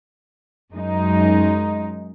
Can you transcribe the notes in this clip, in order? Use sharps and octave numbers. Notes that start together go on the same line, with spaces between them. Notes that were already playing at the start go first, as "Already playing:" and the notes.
F#2 G#3 D#4